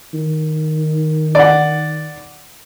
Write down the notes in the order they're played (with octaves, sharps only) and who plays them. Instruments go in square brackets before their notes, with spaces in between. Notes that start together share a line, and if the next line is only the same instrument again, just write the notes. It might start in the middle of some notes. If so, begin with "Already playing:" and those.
[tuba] D#3
[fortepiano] D5 F#5